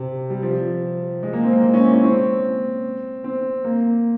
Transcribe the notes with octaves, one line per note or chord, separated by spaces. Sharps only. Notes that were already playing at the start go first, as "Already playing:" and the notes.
Already playing: C3
G3
F3
G#3
A#3
C4
A#3
G#3
C#4
E4
C#4
C4
C4
A#3